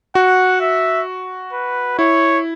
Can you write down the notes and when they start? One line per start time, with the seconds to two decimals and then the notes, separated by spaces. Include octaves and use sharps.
0.15 F#4 F#5
0.61 E5
1.53 B4
1.98 E4 C#5